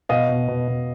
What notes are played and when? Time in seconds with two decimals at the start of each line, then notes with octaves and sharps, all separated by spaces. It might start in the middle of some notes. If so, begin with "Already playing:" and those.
0.09 B2 D#5 F5
0.29 B2
0.48 B2
0.68 B2